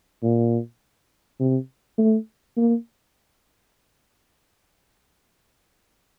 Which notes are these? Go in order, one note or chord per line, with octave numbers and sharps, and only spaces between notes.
A#2
C3
A3
A#3